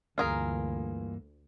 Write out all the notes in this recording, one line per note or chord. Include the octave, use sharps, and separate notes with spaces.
D2 G2 E3 A#3 F4 G#4 A#4